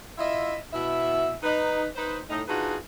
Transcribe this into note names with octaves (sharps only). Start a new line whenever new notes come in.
E4 F4 D#5 E5
B2 E4 E5
D#4 B4
D#4 B4 C5
A2 D#4
D4 D#4 F4 F#4 G#4 B4